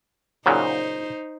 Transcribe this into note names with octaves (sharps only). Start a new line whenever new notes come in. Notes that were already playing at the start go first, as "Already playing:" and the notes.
A#2 C#3 F#3 D#4 C5